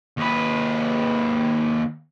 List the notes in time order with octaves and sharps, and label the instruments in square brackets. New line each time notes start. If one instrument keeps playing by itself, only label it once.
[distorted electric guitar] D#2 B4